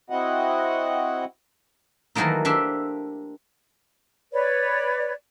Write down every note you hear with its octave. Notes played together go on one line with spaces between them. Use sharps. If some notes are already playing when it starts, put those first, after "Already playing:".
C4 E4 F#4 D#5 F#5
D#3 E3 F#3 A3 A#3 D#4
D4 G4 C5 E5
B4 C#5 D5